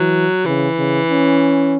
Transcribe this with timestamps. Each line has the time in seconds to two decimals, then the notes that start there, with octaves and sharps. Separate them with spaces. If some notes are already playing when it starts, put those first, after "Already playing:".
Already playing: E3 F#3
0.46 C#3 E3
0.79 C#3
1.10 C#4